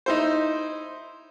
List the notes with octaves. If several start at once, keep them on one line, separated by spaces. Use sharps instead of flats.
D#4 E4 C5